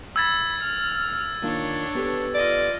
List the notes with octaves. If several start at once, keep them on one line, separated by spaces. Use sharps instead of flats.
B5 E6 G#6 A6
F6
D#3 A#3 D4 F4 C#5
B3 G4 A4
F4 D5 D#5